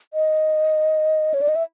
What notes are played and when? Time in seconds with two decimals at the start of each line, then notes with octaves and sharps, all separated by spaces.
0.14 D#5
1.34 C#5
1.41 D5
1.49 D#5
1.56 E5